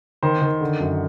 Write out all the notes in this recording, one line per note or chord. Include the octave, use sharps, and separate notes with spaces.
D#3 C5
D#3
D3
F#2